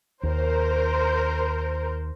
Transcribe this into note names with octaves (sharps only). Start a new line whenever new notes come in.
D#2 A#4 C5